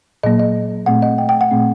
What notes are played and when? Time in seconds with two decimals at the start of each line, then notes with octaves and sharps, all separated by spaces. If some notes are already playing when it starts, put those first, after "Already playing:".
0.23 A#2 F#3 A#3 D#5
0.39 D#5
0.86 A#2 A3 C4 F#5
1.02 D#5
1.18 G5
1.29 G5
1.41 F#5
1.51 A#2 A3 C4